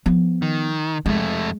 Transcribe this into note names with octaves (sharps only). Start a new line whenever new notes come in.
F3 B3
D#3
F2 G#3 A3